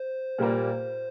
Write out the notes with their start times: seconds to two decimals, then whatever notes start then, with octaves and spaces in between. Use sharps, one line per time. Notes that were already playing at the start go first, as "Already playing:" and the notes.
Already playing: C5
0.38 A#2 G3 A#3